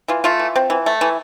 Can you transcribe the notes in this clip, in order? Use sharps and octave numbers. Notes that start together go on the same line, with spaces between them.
E3 F4
A3 F4
E3
C4
E3
A3
E3